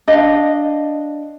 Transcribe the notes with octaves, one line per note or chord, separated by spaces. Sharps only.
D4 D#5 F5